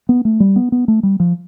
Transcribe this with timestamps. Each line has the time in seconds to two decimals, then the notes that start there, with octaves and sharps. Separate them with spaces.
0.09 B3
0.25 A3
0.40 G3
0.56 B3
0.72 B3
0.88 A3
1.03 G3
1.20 F3